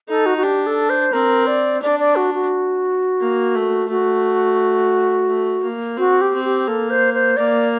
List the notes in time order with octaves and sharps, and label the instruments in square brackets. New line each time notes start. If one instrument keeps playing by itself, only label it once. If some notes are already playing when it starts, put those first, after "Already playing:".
[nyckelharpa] D#4 [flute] A4
[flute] F#4
F#4
[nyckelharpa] D4 [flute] G4
[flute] A4
C5
[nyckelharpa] C4 [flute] A#4
[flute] D5
[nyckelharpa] D4 [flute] D5
[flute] D5
F#4
F#4
[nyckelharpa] A#3
A3
[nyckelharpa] A3 [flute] F#4
[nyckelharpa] A3
A#3
[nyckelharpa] C4 [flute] F#4
[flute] G4
[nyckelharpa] C4
[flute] G4
[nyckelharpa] A#3 [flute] A4
[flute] C5
C5
[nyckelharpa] A#3 [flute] D5